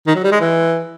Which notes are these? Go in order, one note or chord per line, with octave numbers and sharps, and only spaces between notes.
D#3
F#3
G3
G#3
E3